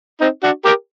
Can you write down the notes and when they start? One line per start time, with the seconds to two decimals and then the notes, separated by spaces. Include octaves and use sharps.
0.21 C4 D#4
0.43 D4 F#4
0.65 G4 A#4